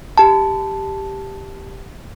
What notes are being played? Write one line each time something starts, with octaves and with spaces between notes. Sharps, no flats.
G4 A5